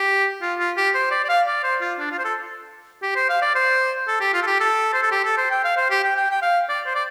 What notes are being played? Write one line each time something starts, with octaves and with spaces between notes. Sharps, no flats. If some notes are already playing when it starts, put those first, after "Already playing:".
Already playing: G4
F4
F4
G4
C5
D5
D5
F5
D5
C5
F4
D4
F4
C5
A4
G4
C5
F5
D5
C5
A4
G4
F4
A4
G4
A4
C5
A4
G4
A4
C5
G5
F5
C5
G4
G5
G5
G5
F5
D5
C5
D5